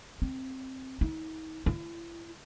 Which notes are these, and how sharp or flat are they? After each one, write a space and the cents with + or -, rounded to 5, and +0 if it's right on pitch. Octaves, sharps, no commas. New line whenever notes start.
C4 +5
D#4 +40
E4 +35